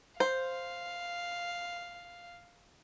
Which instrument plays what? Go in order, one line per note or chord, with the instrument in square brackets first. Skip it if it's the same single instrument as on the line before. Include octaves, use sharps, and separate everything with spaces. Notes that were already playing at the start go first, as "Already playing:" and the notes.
[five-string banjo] C5 [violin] F5